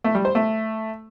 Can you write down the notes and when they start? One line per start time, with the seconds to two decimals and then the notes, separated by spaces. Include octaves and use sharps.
0.04 A3
0.15 G3
0.25 C5
0.35 A3